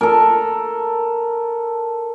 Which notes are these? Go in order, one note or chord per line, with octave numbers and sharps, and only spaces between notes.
A4 A#4